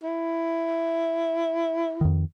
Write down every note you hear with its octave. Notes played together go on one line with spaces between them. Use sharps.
E4
F2 D#3